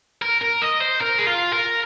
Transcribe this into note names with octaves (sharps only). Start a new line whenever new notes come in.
A#4
A#4
D#5
C5
A#4
G#4
F4
A#4